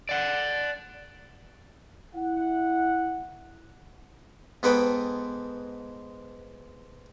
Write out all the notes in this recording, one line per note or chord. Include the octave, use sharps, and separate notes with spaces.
D5 F#5
E4 F#5
G#2 G#3 B3 A4 B4 G5